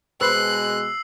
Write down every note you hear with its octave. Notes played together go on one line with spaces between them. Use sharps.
B2 G#3 B4 C5 E6 F#6 C7 F#7